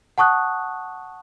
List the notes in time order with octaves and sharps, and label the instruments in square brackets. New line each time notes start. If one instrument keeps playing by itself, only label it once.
[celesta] F#5 A5 C#6 D#6 F#6